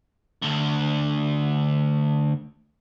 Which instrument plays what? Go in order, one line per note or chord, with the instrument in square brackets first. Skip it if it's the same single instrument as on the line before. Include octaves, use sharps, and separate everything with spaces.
[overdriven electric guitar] D2 D3